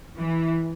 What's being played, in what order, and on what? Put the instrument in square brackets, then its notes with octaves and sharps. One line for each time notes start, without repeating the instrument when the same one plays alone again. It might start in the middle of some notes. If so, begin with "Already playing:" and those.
[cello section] E3